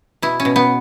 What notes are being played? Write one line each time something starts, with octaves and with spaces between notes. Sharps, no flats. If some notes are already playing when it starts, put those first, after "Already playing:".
B2 E4
C#4
B2
B3